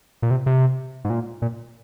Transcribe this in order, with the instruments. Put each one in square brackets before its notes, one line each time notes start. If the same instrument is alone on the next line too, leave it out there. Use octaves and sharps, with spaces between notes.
[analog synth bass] A#2
C3
C3
G#2
A#2
A#2